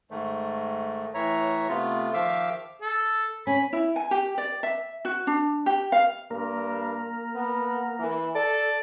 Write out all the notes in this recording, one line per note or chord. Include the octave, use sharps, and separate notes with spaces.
G#2 D#3 A3
A2 E3 C#5 E5 A#5
C3 A3 B3 F4
D#3 F3 E5 F5 D6 E6
A4
C#4 B5
E4
G#5
G4
D5
E5
F#4
D4
G4
F5
G2 A#3 A#4
B3
E3
A4 D5